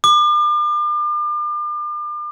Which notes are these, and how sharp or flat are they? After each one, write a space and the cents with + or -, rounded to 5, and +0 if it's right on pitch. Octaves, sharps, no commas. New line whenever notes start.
D6 +40